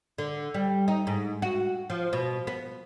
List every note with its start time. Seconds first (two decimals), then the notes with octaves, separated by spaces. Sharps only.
0.18 D3
0.54 G3
0.88 D#4
1.07 G#2
1.42 F#4
1.90 F3
2.13 B2
2.47 B3